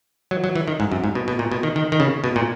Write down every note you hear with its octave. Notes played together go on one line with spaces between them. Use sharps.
F#3
F#3
E3
D#3
G#2
F#2
G#2
B2
B2
A#2
B2
D#3
D#3
D#3
C#3
B2
A#2